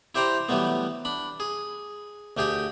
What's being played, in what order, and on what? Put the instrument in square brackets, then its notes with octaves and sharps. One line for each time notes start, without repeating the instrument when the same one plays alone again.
[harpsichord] E4 G4 C5 D5 G5 A#5
E3 F#3 G3 A3 B3
D4 B5
G#4
D2 A3 G4 G#4 G5